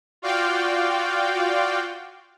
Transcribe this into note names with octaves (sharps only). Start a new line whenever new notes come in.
F4 F#4 D5 F5 G5